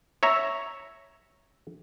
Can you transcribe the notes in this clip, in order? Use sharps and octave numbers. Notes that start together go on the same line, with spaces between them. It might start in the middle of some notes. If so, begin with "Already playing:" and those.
C#5 E5 A#5